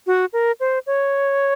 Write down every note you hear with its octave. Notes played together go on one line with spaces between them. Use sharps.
F#4
A#4
C5
C#5